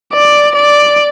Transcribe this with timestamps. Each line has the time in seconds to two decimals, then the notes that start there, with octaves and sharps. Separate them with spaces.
0.14 D5
0.55 D5